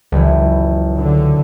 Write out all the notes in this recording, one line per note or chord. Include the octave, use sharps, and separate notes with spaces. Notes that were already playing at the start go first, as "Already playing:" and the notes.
F#1 C#2 E3
D3